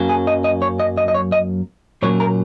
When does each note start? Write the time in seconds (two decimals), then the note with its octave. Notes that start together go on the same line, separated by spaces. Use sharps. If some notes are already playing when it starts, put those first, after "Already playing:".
Already playing: F#2 F#3 A#3 C#4
0.09 G#4
0.27 D#5
0.44 D#5
0.62 C#5
0.80 D#5
0.98 D#5
1.08 D#5
1.14 C#5
1.32 D#5
2.02 A#2 F#3 A#3 C#4 C#5
2.20 A#4